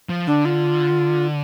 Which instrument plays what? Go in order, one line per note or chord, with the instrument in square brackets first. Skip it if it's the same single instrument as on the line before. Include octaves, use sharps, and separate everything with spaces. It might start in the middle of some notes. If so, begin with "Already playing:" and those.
[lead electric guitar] F3
[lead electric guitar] D3 [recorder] D4
[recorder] F4